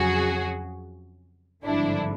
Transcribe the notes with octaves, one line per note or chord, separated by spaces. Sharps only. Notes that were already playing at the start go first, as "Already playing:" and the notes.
Already playing: F2 C#3 F#3 F#4 G#4
G#1 G2 D3 F3 D4 E4